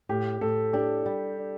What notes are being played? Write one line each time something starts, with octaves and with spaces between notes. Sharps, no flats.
A2 G4
A2 A4
D4 G4
G3